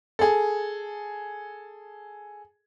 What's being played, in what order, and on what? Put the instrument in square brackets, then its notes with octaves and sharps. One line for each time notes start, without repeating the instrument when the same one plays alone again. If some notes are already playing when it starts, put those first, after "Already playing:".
[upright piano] G#4 A4